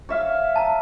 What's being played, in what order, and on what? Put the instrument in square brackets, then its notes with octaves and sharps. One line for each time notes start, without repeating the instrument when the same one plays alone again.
[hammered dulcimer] C#5 E5 F5
[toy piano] A5 A#5